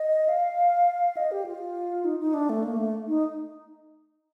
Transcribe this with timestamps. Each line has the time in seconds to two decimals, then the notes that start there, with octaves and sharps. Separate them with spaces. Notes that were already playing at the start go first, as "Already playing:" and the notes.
Already playing: D#5
0.29 F5
1.17 D#5
1.31 G4
1.46 F4
2.05 D#4
2.20 D#4
2.34 D4
2.50 A3
2.64 A#3
2.78 A3
3.08 D#4